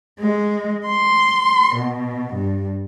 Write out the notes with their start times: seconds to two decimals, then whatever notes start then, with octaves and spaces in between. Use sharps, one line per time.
0.19 G#3
0.86 C6
1.76 B2
2.35 G2